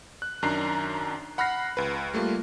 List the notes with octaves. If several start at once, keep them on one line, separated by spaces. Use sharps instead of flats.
F#6
F#2 D#3 D4 A#5 C7
F#5 B5 F6 F#6 A#6 C7
C#2 B4
G3 A3 A#3 F4